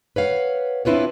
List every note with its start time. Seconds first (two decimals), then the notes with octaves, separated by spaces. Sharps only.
0.16 B4 C#5 F5 F#5
0.85 C4 D4 E4 F4 B4 C#5